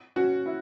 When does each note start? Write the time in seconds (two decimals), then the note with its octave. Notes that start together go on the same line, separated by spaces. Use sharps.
0.16 C#4 F#4
0.46 E4